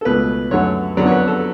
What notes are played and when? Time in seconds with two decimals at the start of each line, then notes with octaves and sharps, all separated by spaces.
0.01 A4
0.05 C#2 B2 A3 B4
0.51 F#2 D3 F#3 A3 C#5
0.97 F2 D3 F#3 B3 D5
1.06 C#5
1.12 B4
1.28 A4